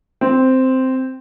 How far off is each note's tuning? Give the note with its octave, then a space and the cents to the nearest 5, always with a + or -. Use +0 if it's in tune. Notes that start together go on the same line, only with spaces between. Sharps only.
C4 -5